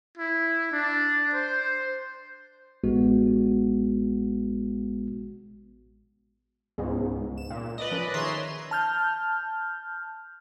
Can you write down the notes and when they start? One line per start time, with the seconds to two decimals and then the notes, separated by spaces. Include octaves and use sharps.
0.17 E4
0.72 D4
1.34 C5
2.84 A1 G#3 B3 F#4
6.78 C#2 G#2 G3 B3 C4
7.38 E7
7.50 A#2
7.78 B4 D5 D#5
7.91 F3 C#4 A#4
8.14 D#3 G#4 C#5 E5 A#5 C6
8.71 A5 F6 G6